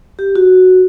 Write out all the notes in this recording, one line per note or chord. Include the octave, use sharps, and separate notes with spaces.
G4
F#4